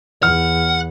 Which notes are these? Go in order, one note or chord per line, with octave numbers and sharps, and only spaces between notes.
E2 F#5 F6